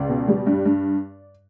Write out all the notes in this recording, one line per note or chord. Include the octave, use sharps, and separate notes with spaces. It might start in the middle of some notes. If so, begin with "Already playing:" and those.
Already playing: C#2 D5
B2
G3
G2
G2